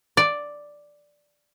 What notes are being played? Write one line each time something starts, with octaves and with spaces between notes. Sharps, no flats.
D5